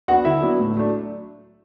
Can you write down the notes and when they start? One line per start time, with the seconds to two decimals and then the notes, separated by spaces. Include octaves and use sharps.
0.08 F#3 B3 D4 F#4 F#5
0.25 D3 E4 E5
0.41 F#3 B3 D4
0.59 A2
0.75 F#3 A3 D4